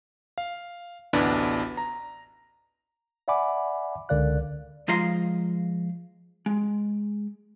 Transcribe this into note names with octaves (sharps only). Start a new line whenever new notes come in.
F5
A1 D2 B3 D4 E4 B5
A#5
D5 E5 F#5 G#5 B5 D6
C#2 D3 A#4 D5 F5 F#6
F3 G#3 F4 A#5 C6
G#3